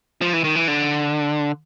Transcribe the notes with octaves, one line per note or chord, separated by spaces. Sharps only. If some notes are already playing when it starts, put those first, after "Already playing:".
F3
E3
D#3
E3
D3